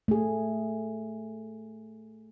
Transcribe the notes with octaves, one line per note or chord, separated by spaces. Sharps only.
A3 G#4